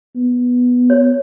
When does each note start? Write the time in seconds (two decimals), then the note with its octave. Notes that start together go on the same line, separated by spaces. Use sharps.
0.15 B3
0.90 C#5